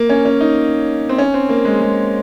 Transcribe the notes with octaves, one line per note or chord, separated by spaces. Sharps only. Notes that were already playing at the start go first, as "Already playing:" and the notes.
Already playing: A#3
C#4
C#4
D#4
C4
C#4
C4
A#3
G#3
G#3